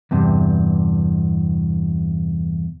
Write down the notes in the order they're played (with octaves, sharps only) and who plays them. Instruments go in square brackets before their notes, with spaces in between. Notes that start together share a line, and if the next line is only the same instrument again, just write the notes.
[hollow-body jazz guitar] E2 G2 C3